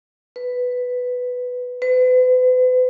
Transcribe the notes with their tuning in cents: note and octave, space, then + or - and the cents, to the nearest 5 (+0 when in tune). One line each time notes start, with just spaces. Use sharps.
B4 +5
B4 +40